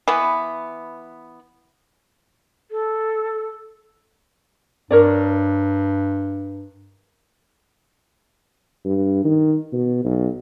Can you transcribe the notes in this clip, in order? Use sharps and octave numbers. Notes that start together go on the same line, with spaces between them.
E3 B3
A4
G2 A#4 C#5 D5
G2
D#3
B2
B1